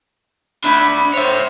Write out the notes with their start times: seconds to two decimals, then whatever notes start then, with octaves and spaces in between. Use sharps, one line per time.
0.64 D4 E5 B5
1.14 C5 C#5 E5